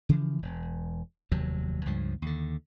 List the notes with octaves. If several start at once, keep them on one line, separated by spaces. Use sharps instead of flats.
C#3 E3 F3
E1
F1 D#2 C3 F#3
C#2 G2 F3
D#2 D3